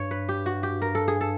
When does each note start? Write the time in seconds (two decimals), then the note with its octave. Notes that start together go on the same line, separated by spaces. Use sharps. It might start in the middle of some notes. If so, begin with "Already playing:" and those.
Already playing: G2 C#5
0.11 B4
0.29 G4
0.46 F#4
0.63 G4
0.82 A#4
0.95 A4
1.08 G#4
1.21 A4